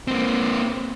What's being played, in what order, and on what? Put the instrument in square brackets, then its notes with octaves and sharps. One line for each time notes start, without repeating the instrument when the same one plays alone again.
[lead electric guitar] A#3 C4